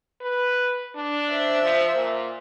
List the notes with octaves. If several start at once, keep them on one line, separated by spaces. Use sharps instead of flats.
B4
D4
C5 E5
F3
A#2